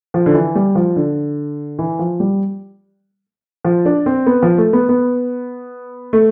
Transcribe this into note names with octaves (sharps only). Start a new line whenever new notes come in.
F3
D3
E3
G3
F3
D3
E3
F3
G3
F3
D4
C4
B3
F3
A3
B3
B3
A3